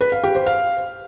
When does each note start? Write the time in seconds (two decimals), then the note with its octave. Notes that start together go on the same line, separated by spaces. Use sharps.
0.01 B4
0.12 F5
0.24 G4
0.35 C5
0.46 F5